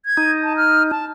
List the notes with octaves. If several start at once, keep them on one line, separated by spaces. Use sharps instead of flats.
G#6
D#4
A5
F6
A5